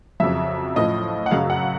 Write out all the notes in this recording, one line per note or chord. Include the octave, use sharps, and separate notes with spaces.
F2 C#3 F#3 E5
A2 F3 D#5
F#5
F#2 C#3 F#3 F5
F#5